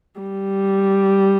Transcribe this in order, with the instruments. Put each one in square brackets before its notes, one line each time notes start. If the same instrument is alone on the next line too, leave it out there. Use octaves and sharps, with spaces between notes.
[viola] G3